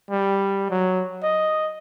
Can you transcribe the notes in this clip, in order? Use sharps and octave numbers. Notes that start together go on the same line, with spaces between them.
G3
F#3
D#5